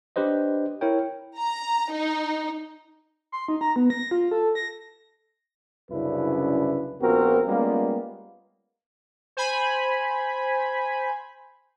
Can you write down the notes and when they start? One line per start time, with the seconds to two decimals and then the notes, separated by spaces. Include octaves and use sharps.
0.16 D4 G4 B4 C5 D#5
0.81 E4 A#4 C#5 G5
1.38 A#5
1.91 D#4
3.32 C6
3.48 D#4
3.61 A#5
3.76 B3
3.90 A#6
4.11 F4
4.31 A4
4.55 A#6
5.91 C2 F#2 C#3 D4 E4 B4
7.01 A#1 B3 C4 F4 F#4 A#4
7.47 G3 G#3 A#3 B3 C#4 F4
9.37 C5 G#5 B5